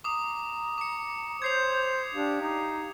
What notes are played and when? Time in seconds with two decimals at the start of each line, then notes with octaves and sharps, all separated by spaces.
0.04 A#5 D6 D#6
0.78 D6 C#7
1.42 C5 C#5 C6 G6 G#6 C7 F7
2.14 D4 G4 F5
2.41 D#4